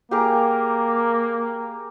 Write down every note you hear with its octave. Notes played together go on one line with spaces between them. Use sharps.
A#3 G4 G#4 A#4